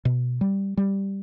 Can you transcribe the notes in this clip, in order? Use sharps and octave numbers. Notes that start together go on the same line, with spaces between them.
B2
G3
G3